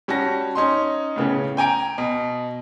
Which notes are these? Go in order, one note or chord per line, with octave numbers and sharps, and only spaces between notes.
G3 C#4 F#4 A5 A#6
C#4 D#4 C6
A2 C#3 B3 C#4
G5 G#5 A#5 D7
B2